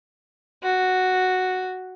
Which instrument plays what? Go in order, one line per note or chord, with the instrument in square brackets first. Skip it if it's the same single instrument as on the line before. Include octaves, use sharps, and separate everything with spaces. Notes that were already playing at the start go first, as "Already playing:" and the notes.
[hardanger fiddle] F#4